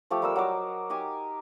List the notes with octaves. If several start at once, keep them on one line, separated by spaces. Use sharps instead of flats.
F3 A3 G4
G3 A#4 E6
F#3 C5 D#5 D6
D#4 G4 G#5 D6